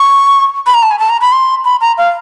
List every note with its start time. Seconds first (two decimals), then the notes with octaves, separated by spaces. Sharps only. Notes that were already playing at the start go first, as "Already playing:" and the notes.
Already playing: C#6
0.66 B5
0.74 A#5
0.83 A5
0.91 G#5
0.99 A5
1.10 A#5
1.21 B5
1.32 C6
1.65 B5
1.81 A#5
1.98 F5